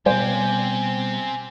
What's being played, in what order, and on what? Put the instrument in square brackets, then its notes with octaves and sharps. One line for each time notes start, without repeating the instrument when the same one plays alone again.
[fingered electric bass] B2 G3 [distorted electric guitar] C4 G4 [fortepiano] C5 [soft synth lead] G#5